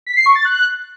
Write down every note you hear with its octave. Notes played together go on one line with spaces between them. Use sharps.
B6
C7
C#6
A6
F#6